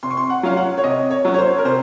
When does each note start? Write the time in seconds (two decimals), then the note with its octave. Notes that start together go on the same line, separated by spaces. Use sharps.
0.03 C3 C6
0.10 C#6
0.17 C6
0.30 F#5
0.43 F#3 C#4 F5
0.57 F#5
0.78 C#5
0.84 C3 D#5
1.11 C#5
1.25 F#3 C#4
1.34 C#5
1.38 C5
1.58 A#4
1.65 C3 C5